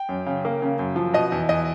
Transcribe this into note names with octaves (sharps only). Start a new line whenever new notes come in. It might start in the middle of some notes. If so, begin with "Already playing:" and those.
Already playing: G5
F#2
C#3
A#3
C#3
F#2
F3
B2 D#5
E2
E2 D#5